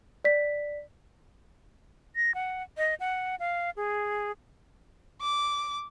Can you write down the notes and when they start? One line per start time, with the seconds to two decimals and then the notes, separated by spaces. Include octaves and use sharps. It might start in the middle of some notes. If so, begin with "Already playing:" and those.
0.24 D5 B6
2.16 A#6
2.35 F#5
2.77 D#5
3.00 F#5
3.40 F5
3.77 G#4
5.22 D6